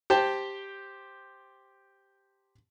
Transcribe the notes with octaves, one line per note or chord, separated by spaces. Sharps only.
G4 C5 G5 A5